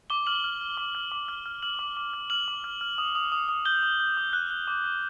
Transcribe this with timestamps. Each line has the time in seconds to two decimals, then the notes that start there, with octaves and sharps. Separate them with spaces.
0.10 D6 G7
0.27 F6 F#7
0.44 F6
0.61 F6
0.77 D6
0.95 F6
1.12 D6
1.28 F6
1.46 F6
1.62 F6 F#7
1.79 D6
1.97 D6
2.13 F6
2.30 F6 F#7
2.48 D6
2.64 F6
2.81 F6
2.98 D#6
3.15 D#6
3.32 D#6
3.49 D#6
3.65 G6 G7
3.83 D#6
4.00 G6
4.17 D#6
4.33 F#6
4.50 F#6
4.67 D6
4.84 D6